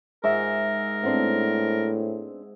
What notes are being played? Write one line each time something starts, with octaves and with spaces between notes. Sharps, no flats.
G#2 A#4 E5 F#5
A2 B3 C4 D4